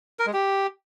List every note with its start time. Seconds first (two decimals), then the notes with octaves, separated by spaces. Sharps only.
0.19 A#4
0.26 G#3
0.33 G4